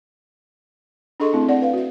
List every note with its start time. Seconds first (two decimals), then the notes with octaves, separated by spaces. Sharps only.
1.20 D4 G#4 A4 D#5 C6 C#6
1.33 A3 C4 E4
1.48 C4 D5 F#5
1.61 B4 F5
1.73 F#4 E5